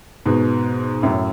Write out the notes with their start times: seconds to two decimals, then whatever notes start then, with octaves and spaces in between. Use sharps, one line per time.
0.26 G#2 B2
1.03 F#2 A2